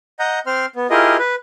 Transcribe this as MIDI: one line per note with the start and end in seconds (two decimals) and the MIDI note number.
0.19 0.39 75
0.19 0.39 78
0.19 0.39 82
0.19 0.39 91
0.47 0.66 60
0.47 0.66 72
0.47 0.66 84
0.47 0.66 89
0.76 0.87 59
0.90 1.17 64
0.90 1.17 65
0.90 1.17 67
0.90 1.17 68
0.90 1.17 70
0.90 1.17 75
1.19 1.35 71